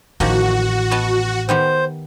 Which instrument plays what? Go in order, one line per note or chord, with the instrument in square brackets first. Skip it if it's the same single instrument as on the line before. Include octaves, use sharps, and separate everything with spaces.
[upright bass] A1 [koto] D#3 F3 A#3 [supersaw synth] F#4
[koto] B3 D#5 A5
[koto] D#3 B3 G4 [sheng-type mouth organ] C5